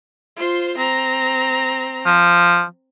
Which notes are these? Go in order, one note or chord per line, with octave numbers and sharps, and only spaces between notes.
F4 C5
C4 A#5
F3